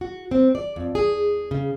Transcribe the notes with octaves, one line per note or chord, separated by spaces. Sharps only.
F#4
C4
D5
F2
G#4
C#3